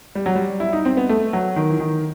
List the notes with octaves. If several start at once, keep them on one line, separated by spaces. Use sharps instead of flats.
G3
F#3
G3
E4
D#4
C4
B3
A3
F#3
D#3
E3
D#3